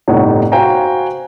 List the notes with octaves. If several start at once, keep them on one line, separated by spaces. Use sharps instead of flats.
G1 A2 C3 D#4 C#5 F#5
F#4 C5 F5 G5 G#5 A#5